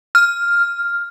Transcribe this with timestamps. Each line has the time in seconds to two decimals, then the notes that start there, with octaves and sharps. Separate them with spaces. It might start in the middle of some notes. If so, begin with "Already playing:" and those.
0.15 F6